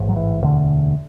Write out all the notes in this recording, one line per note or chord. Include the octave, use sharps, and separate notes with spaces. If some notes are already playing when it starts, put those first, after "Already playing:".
Already playing: A1 G#2
F#3
E3
E1 D2 D3